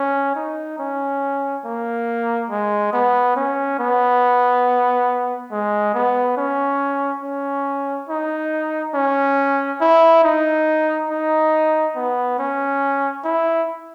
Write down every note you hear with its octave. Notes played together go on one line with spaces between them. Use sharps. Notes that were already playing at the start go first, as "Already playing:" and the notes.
Already playing: C#4
D#4
C#4
A#3
G#3
B3
C#4
B3
G#3
B3
C#4
C#4
D#4
C#4
E4
D#4
D#4
B3
C#4
E4